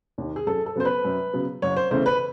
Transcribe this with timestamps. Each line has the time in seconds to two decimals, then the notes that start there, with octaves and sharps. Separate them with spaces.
0.18 D#2 D#3
0.36 G#4
0.46 F#2 A4
0.66 A4
0.76 C#3 F#3 B3 C5
0.85 B4
1.05 F#2
1.33 C#3 F#3 B3
1.62 F#1 C#5
1.77 C5
1.91 E2 C#3 E3 A3 C5
2.06 B4